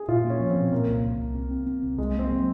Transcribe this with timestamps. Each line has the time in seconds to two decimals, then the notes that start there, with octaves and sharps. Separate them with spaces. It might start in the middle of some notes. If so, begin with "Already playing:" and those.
Already playing: G#4
0.08 A#2 F4
0.24 A#3
0.30 C#4
0.40 F3
0.50 C4
0.56 A#2
0.72 A#2 A#3
0.87 C2
1.04 C2
1.19 C2
1.35 C4
1.51 C4
1.66 C4
1.83 C2
1.98 C2 G#3
2.14 A#3
2.19 C4
2.30 F#3